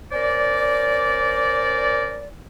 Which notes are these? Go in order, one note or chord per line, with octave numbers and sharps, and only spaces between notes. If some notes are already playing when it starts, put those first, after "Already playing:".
C#4 A#4 C5 D5